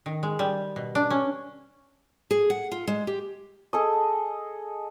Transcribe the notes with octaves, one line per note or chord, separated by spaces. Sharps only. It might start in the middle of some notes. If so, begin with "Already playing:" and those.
D#3
G#3
G3
B2
D4
C#4
G#4
F#5
F4
G#3
G4
G#4 A4 D#5